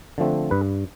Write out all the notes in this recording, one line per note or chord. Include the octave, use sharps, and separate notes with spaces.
D3 F3 A3 C4
G2 B4